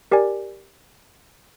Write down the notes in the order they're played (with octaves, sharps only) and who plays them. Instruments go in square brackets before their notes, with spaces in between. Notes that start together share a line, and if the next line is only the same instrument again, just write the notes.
[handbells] G4 A#4 D5 G#5